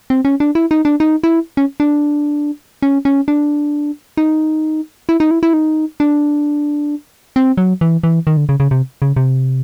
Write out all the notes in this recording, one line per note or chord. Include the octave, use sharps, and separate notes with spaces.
C4
C#4
D4
E4
D#4
D4
D#4
E4
C#4
D4
C#4
C#4
D4
D#4
E4
D#4
E4
E4
D#4
D4
C4
F#3
E3
E3
D#3
D3
C#3
C#3
C3
C#3
C3